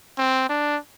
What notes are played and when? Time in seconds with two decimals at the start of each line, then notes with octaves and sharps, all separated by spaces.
0.18 C4
0.50 D4